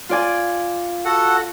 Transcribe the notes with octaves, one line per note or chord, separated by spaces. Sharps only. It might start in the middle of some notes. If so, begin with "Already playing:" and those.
F4 D5 G#5
F#4 A4 F#5